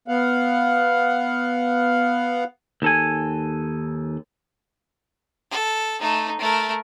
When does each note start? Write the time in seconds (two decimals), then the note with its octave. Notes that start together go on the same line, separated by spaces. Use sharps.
0.08 B3 F5 F#5
2.82 D#2 A4 G#5
5.51 A4
6.01 A3 D#4
6.39 A3 A#4